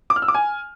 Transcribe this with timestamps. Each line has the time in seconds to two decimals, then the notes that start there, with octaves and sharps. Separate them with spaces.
0.10 D6
0.16 F6
0.22 E6
0.28 D6
0.34 G#5